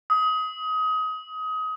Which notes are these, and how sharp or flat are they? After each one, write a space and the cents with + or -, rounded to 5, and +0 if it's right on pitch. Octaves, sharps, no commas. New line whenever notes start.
D#6 +25